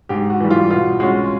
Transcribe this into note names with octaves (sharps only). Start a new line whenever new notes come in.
G#2 G4
F#4
E3 G3
F4
B2 F4
G#3 C#4 F#4